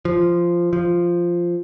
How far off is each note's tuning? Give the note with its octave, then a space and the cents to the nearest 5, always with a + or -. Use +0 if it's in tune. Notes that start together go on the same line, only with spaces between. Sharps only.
F3 -10
F3 -5